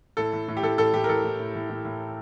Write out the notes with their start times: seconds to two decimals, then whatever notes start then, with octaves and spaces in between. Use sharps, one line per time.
0.17 A2 A4
0.33 A2
0.48 A2
0.57 G4
0.63 A2 A4
0.78 A2 A4
0.94 A2 G4
1.04 A#4
1.09 A2 A4
1.24 A2
1.40 A2
1.55 A2
1.70 A2
1.85 A2